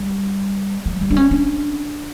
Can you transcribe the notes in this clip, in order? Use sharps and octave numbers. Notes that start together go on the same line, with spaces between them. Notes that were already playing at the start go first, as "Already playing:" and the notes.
Already playing: G3
F#3
G3
D4
C#4
D4